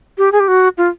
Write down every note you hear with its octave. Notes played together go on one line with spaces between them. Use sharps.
G4
G#4
G4
F#4
F4